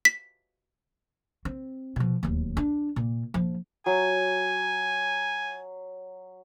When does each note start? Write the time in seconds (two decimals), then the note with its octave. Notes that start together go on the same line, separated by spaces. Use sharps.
0.05 B6
1.45 C4
1.96 B2 F3
2.23 D1 D#2
2.57 D4
2.96 A#2
3.34 A#1 F3
3.86 F#3 G#5